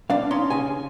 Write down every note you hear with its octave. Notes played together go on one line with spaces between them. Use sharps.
D4 F5
C#4 D#4 C6
C#3 G#5